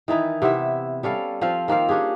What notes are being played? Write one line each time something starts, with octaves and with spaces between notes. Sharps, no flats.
D#3 E3 D#4 E4
C3 B3 E4 E5
G3 C#4 A4 F5
F3 C4 F4 F5
D#3 A#3 C4 F5
C#4 D4 G4 G#4